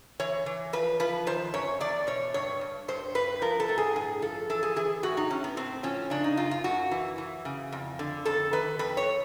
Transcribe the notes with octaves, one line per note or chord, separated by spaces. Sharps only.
E3 C#5
E3
F3 B4
F3 B4
D#3 C5
F#2 C#5
E2 D5
B2 C#5
G2 C#5
G2
G2 C5
G2 B4
F3 A#4
A4
A2
G#4
G2 G#4
F3 A4
E3 A4
G#4
E3 G#4
A2 F#4
D#4
A2 C#4
B3
A2 C4
F3 C#4
C#3 D4
D#4
F#2 F4
F4
F#2 F#4
E3
E3
C#3
F2
D3
F2 A4
D#3 B4
F2 B4
C#5